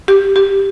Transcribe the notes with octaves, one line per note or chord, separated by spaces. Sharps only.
G4
G4